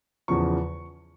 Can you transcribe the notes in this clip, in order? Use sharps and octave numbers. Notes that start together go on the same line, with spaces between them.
E2 C#3 F3 C#6